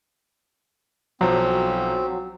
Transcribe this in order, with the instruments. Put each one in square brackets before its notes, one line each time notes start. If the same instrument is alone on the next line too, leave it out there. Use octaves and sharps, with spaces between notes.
[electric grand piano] B1 F3 [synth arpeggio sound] F#3 [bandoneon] C4